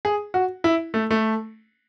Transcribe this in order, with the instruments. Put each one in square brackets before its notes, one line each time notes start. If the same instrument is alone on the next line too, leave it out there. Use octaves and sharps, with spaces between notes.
[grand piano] G#4
F#4
E4
A3
A3